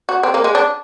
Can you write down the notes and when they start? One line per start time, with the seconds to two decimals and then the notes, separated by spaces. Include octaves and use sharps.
0.09 F#4
0.23 C4
0.34 A#3
0.44 G#3
0.55 D4